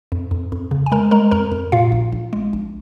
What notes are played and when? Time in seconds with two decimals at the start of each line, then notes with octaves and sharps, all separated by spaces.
0.12 F2
0.31 F2
0.52 F2
0.71 C#3
0.86 G#5
0.92 G#3 A#4 A#5
1.11 G#3 A#4 A#5
1.31 F2 A#4 A#5
1.52 F2
1.72 A#2 F4 F5
1.92 A#1
2.12 A#1
2.33 G#3
2.53 A#1